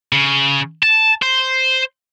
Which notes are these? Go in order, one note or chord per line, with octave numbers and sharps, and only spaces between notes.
C#3
A5
C5